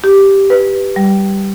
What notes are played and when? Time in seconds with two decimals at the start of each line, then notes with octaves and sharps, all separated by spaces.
0.04 G4
0.50 B4
0.96 G3